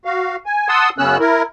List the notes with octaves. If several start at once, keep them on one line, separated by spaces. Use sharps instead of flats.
F#4 F5
G#5
F#5 A5 C6 D#6 E6
F#2 C#3 B3 C#4 E6 F#6
E4 A#4